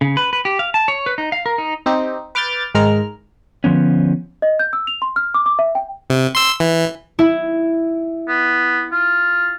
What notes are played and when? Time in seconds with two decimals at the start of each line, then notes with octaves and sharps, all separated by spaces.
0.01 C#3
0.17 B4
0.33 B4
0.45 G4
0.59 F5
0.74 A5
0.88 C#5
1.06 B4
1.18 D#4
1.32 F5
1.46 A#4
1.58 D#4
1.86 C4 D#4 G4
2.35 B4 D6 F6 G6 A6
2.75 G#2 D#3 G#3 A#4 F6
3.64 D3 F3 B3 C#4
4.42 D#5
4.59 G6
4.73 E6
4.87 F7
5.02 C6
5.16 F6
5.34 D6
5.46 D6
5.59 E5
5.75 G5
6.10 C3
6.35 C6 E6
6.60 E3
7.19 E4
8.28 B3
8.92 F4